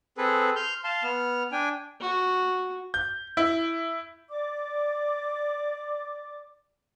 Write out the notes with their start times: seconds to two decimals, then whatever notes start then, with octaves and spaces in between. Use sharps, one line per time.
0.18 C4 G#4 A4 B4
0.56 C6 F6 G6
0.84 F5 A5 C6
1.03 B3 F6
1.52 D4 G5 G#5
2.01 F#4
2.94 G6
3.37 E4
4.29 D5 D6